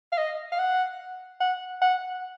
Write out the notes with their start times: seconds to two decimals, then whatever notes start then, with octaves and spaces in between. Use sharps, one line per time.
0.12 F5
0.18 D#5
0.52 F5
0.59 F#5
1.40 F#5
1.81 F#5